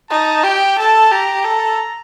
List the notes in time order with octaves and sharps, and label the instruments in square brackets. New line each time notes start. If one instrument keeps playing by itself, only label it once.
[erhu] D#4 [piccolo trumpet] A5
[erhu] G4 [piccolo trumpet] G5
[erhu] A4 [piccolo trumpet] A5
[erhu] G4 [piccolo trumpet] A#5
[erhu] A4